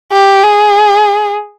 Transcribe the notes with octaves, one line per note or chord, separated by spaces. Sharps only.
G4
G#4